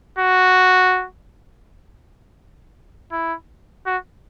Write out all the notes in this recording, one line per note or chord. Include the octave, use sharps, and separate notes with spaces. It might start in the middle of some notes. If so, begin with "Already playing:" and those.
F#4
E4
F#4